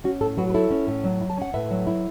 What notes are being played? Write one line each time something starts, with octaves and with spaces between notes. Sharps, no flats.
C#4 F#4
A2 A4
F#3 F#4 B4
B4
E4 A4 C#5
C#4
A2
F#3
E4
A5
C#4 F#5
A2 B4 E5
F#3
E4